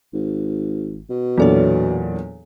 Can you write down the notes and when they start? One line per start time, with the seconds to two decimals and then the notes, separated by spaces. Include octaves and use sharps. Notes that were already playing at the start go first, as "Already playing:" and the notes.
0.14 G#1
1.10 B2
1.38 E2 A#2 F#3 D4 A4 C#5